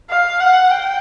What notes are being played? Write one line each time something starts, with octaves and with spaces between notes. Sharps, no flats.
F5
F#5
G5